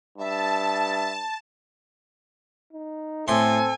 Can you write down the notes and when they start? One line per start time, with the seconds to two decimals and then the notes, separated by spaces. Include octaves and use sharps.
0.18 G2 E5 A5
2.73 D#4
3.28 A2 C4 A4 G#5 C6